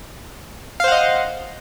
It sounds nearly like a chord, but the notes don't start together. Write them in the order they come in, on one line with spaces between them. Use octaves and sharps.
F5 C5 F#5 D#5